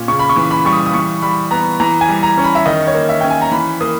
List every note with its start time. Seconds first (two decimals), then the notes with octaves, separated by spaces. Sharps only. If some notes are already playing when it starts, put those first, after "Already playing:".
Already playing: A#2 C#4
0.08 C#3 C#6
0.19 B5
0.29 C#6
0.36 E3
0.51 B5
0.65 G3 C#6
0.72 D#6
0.86 D#6
0.94 E3 C#6
1.22 G3 B5
1.51 B3 A#5
1.80 E3 A#5
2.01 G#5
2.09 G3
2.23 A#5
2.37 C#4
2.44 B5
2.55 E5
2.66 D#3 D#5
2.87 C#5
2.94 A#3
3.09 E5
3.21 C#4 G5
3.30 G#5
3.42 A#5
3.52 E3 B5
3.81 A#3 D#6